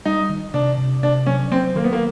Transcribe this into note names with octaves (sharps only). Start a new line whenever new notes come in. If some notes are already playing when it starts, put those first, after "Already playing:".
G3 D#4
D#3
C3 D4
C3
C3 D4
F#3 C#4
F#3 C4
D#3 A#3
B3
A#3